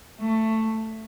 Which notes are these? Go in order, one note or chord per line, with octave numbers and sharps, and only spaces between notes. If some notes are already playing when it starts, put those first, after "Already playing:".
A3